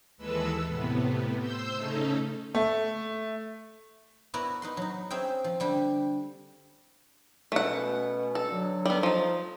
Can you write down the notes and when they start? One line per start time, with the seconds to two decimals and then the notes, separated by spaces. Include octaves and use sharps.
0.17 D#2 E3 G#3 A4 B4 E6
0.66 A2 C3 B3
1.40 C5 E6 G6
1.73 C#3 A3 C#4 D#4 A4
2.55 A3
4.34 B3 E4 F#4 A#4 B4 D5
4.62 D#4 B4 C6
4.77 F#3 D#4
5.10 C4 C#4 G#4 E5 G5
5.44 F3
5.60 D3 G3 G4
7.52 B2 A3 C#4 F#5
8.35 A4
8.51 D3 F#3
8.86 G3 B3
9.03 F3 D#4